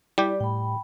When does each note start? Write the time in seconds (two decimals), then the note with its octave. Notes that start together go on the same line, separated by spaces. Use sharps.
0.18 G3 E4 G4 D5
0.40 A2 G5 B5